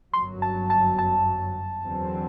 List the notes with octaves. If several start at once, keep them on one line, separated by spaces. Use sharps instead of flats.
G1 F#2 F#3 C6
A5
A5
A5
E2 D3 F#3 C4